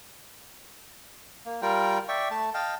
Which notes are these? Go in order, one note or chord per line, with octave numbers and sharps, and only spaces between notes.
A#3
G3 F4 A#4 G5
D5 E5 G5 C#6
A3 A5
D#5 F5 G5 A5